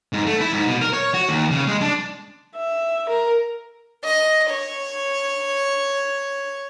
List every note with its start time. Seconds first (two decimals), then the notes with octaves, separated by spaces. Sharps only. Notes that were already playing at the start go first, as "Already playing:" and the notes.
0.13 G#2
0.27 A3
0.40 E4
0.53 G#2
0.67 B2
0.81 A#4
0.93 C#5
1.14 F#4
1.29 D#2
1.51 C#3
1.67 G#3
1.81 D4
2.56 E5
3.09 A#4
4.04 D#5
4.51 C#5